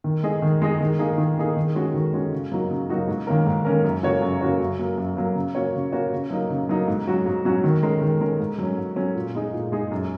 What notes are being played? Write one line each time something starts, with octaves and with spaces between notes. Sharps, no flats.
D#3
G#3 D#4 G#4 D#5
D#3
G#3 D#4 G#4 D#5
D#3
A#3 D#4 G#4
D#3
A#3 D#4 G#4
D#3
G#3 C#4 F#4
D#3
G#3 C#4 F#4
C#3
F#3 A#3 D#4 F#4
C#3
F#3 A#3 D#4 F#4
G#2
D#3 A#3 C#4 A#4
G#2
D#3 A#3 C#4 A#4
F#2
C#3 A#3 F#4 C#5
F#2
C#3 A#3 F#4 C#5
F#2
F#3 A#3
F#2
F#3 A#3
C#3
A#3 C#4 F#4 C#5
C#3
A#3 C#4 F#4 C#5
C#3
F#3 A#3 D#4
C#3
F#3 A#3 D#4
G#2
F#3 C#4 F#4
G#2
F#3 C#4 F#4
D#3
G#3 C#4 A#4
D#3
G#3 C#4 A#4
G#2
F#3 C#4
G#2
F#3 C#4
A#2
G#3 D#4 G#4
A#2
G#3 D#4 G#4
F#2